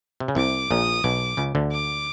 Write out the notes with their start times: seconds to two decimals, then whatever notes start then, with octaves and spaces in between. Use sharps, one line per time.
0.20 C3
0.28 C#3
0.35 C2 C3 D6
0.71 A#1 A#2 D#6
1.04 B1 B2 D6
1.37 C#2 C#3
1.55 D2 D3
1.71 D6